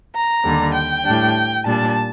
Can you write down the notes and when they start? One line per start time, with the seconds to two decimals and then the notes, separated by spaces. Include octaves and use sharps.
0.14 A#5
0.44 D#2 D3 G3
0.74 G5
1.04 A2 G3 D4
1.65 A#2 G3 D4 A5